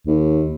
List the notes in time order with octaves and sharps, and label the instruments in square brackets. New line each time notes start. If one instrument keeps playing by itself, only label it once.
[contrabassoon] D#2